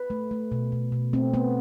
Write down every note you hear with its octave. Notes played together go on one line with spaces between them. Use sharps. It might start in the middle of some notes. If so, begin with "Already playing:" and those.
Already playing: B4
A3
A3
B2
B2
B2
A3 C4
A3 B3